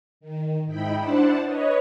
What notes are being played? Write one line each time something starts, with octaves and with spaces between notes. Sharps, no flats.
D#3
G#2 D#4 E4 G5 B5
D4 E4 C5 D5 F#5 A5
B4 C#5 D#5